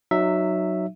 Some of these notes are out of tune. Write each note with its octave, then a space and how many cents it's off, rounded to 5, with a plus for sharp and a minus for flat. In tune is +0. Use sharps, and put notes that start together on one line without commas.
F#3 +0 D#4 -25 E5 +0